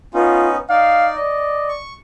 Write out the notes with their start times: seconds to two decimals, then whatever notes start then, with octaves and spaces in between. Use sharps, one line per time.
0.14 B3 C#4 D#4 F4
0.70 D#4 D5 F5
1.16 D5 D#5
1.68 C#6